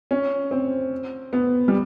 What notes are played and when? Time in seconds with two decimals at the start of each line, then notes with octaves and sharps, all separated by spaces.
0.11 C#4
0.51 C4
1.33 B3
1.68 G3